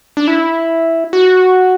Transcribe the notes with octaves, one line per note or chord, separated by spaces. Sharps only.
D4
E4
F#4